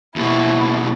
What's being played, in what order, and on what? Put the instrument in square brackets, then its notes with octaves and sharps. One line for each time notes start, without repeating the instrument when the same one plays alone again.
[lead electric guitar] D#2 B2 [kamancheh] E4